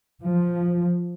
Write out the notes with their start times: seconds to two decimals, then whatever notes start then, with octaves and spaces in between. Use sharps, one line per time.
0.24 F3